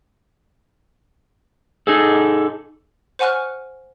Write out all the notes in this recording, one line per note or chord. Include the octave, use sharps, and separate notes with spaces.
D#4 G#4 A4
C5 F#5 G#5 C#6 F6 F#6